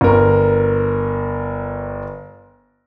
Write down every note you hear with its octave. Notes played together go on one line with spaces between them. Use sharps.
G1 A#4